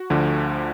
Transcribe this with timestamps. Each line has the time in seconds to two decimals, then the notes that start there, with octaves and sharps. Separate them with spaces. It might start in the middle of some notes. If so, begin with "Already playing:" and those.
Already playing: F#4
0.10 D2 D3 F3